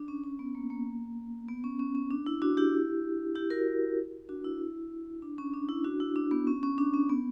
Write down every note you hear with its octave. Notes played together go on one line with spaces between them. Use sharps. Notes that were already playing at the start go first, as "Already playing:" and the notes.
Already playing: D4
C#4
C#4
B3
A#3
A#3
B3
C#4
C#4
C#4
D4
E4
D4 F#4
E4 G4
E4 G4
F#4 A#4
D4 F#4
E4
D4
C#4
D4
E4
D4 F#4
E4
D4
B3
C#4
C#4
D4
C#4
B3